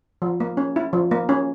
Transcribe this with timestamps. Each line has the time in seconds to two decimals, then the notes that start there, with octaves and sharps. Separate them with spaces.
0.22 F3
0.40 A#3
0.57 C#4
0.76 E4
0.93 F3
1.11 A#3
1.29 C#4